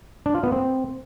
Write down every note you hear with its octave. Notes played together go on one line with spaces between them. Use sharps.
D4
F4
B3
C4